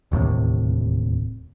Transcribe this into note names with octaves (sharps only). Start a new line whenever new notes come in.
E1 D#2 A2 C3